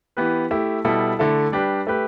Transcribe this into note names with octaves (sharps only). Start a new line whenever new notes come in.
E3 B3 G4 B4
A3 E4 G4
B2 G3 E4 A4
D3 A3 E4 A4
G3 D4 G4 B4
A3 G4 B4